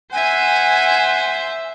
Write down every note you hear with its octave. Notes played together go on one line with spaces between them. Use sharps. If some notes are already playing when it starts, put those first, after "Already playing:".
C5 E5 F#5 G#5